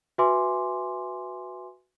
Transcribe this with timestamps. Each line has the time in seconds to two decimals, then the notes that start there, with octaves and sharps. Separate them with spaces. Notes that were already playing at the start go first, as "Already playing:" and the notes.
0.18 F#4 B4 E5 G#5 C6 D6